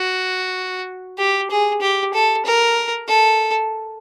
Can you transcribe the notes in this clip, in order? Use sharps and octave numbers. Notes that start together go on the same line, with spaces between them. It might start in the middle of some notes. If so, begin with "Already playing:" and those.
Already playing: F#4
G4
G#4
G4
A4
A#4
A4